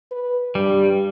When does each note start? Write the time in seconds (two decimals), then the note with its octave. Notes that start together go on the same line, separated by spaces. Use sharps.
0.11 B4
0.55 G2 G3